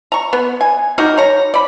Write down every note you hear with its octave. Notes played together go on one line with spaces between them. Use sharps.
A#5 C#6
B3
G#5
D#4 F#4 G4 A#4
C#5 A#5
D5 B5